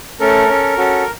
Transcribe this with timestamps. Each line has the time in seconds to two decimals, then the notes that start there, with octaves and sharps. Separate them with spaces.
0.20 A3 C#4 A4 A#4
0.48 C#4 A4
0.78 C#4 F#4 A4